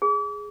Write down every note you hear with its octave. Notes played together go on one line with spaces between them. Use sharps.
G#4